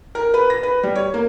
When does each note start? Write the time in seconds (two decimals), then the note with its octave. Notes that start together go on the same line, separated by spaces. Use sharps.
0.15 A#4
0.34 B4
0.50 A#6
0.63 B4
0.83 G3
0.95 C#5
1.14 A#3